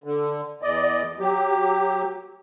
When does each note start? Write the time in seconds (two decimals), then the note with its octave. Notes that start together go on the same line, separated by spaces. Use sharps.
0.04 D3
0.62 E2 D5 D#5
1.19 F#3 G4